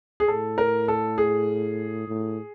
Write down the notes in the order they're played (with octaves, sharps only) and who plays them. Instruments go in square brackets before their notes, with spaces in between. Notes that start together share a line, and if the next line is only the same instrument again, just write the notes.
[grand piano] G#4
[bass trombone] A2 [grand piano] A4
[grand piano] A#4
A4
G#4
[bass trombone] A2